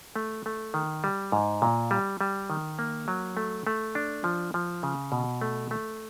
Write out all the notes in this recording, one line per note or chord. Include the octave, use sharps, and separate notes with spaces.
A3
A3
D#3
G3
G#2
A#2
G3
G3
D#3
A#3
F#3
A3
A3
D4
F3
F3
C#3
B2
A3
A3